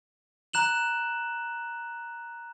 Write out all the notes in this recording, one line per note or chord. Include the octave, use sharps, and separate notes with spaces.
A#5 F#6 E7 F#7